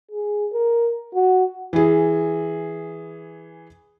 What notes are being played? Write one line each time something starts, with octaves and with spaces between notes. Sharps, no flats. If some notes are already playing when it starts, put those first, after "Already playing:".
G#4
A#4
F#4
E3 G#4